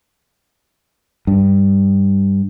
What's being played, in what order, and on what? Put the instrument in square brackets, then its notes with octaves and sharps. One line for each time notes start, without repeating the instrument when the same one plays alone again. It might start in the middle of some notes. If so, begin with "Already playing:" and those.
[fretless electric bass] G2